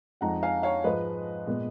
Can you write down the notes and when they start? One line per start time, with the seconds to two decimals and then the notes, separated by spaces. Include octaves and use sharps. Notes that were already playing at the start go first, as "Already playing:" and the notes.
0.21 F2 F3 G#3 D#4 F#5 A#5
0.43 F5 G#5
0.63 C#5 F5
0.84 G#2 F3 G#3 B4 D#5
1.47 A#2 G#3 B3